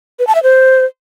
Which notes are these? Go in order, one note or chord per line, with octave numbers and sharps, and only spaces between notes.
B4
A5
E5
C5